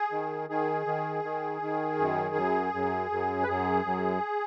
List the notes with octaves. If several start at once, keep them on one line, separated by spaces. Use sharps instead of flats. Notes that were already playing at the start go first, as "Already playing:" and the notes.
Already playing: G#4
D#3
D#3 G#4
D#3
D#3
D#3
F#2
F#2
F#2
F#2
B4
F#2 G#4
F#2